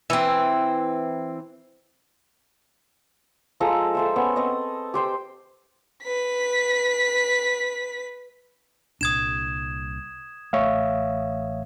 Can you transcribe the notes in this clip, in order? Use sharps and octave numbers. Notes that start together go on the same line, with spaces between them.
E3 C4
F3 G#3 A4 A#5
A4 C5 E5
B3 C#4 C#6
C4 D#5
G4 C5 G5
B4 B6
C2 A#2 D4 D#6 G#6 E7
A1 A3 C#5 E5 F5